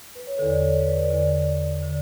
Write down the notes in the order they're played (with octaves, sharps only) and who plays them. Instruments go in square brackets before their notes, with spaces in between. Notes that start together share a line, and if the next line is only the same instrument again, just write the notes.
[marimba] B4
C#5
E2 D3 A4
D5
C#5
B4
B4
D5
E2 D3 D5
D3